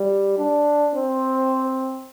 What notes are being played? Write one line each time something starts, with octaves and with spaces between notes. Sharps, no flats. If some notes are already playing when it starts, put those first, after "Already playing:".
Already playing: G3
D4
C4